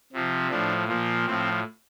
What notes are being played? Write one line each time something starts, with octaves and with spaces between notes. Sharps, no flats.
C3 F3
A2 F3 D4
A#2 F3
A2 F3 C4